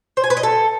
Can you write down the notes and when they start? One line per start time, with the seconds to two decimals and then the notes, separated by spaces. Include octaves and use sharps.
0.17 C5
0.24 G#5
0.30 B4
0.37 D#5
0.43 A4